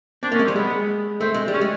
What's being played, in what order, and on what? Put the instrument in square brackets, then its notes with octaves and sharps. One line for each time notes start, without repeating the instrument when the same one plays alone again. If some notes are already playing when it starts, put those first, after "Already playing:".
[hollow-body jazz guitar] C4 [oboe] D4
[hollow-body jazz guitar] A#3 [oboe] C#4
[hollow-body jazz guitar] G#3
[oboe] C4
[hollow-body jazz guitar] G3
[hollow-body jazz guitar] G#3 [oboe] B3
[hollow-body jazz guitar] A3 [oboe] C4
[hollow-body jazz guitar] G#3
G3
[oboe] C#4
[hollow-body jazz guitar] G#3